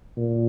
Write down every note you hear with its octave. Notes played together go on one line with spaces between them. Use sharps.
A#2